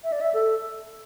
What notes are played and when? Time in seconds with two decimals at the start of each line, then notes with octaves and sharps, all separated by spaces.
0.04 E5
0.12 D5
0.21 E5
0.34 A4